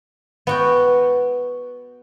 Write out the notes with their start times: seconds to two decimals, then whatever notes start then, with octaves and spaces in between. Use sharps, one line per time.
0.47 B3 F#4 G5